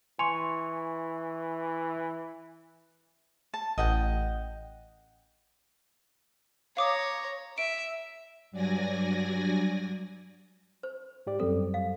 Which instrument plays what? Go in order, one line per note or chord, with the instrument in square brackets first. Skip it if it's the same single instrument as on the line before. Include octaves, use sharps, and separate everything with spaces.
[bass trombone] E3 [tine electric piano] G#5 C#6 [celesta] C6 C#7 F7
[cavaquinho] A5
[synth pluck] A1 [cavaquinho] D#5 F#5 G5
[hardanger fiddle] C#5 A#5 [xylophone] F5 D6 D#6
[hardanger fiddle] E5 [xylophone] D7
[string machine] G2 F#3 D5 G#5 A#6
[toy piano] C5
[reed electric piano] G#2 G4 D5
[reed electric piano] F#2 G3 C4 [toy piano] A4
[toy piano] F5